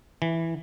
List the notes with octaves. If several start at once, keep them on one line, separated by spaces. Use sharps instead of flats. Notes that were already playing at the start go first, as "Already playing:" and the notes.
E3